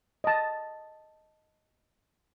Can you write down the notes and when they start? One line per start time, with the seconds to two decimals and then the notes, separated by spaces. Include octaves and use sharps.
0.24 D#5 A5